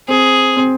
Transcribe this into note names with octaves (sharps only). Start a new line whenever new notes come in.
C4 G#4
C4